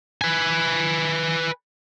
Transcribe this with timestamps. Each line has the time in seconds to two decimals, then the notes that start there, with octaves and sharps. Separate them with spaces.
0.21 B4 G#5